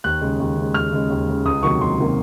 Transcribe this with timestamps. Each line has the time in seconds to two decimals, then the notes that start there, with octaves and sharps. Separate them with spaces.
0.04 D#2 F#6
0.21 C#3 G#3
0.40 D#2
0.57 C#3 G#3
0.74 D#2 F6
0.92 C#3 G#3
1.10 D#2
1.28 C#3 G#3
1.46 C#2 D#6
1.63 C3 D#3 F#3 A#3 C#6
1.81 C#2 C6
1.99 C3 D#3 F#3 A#3